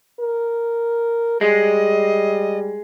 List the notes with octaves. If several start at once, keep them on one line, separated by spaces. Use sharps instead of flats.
A#4
G3 G#3 D#5